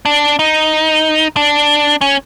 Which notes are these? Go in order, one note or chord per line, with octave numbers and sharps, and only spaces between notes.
D4
D#4
D4
C#4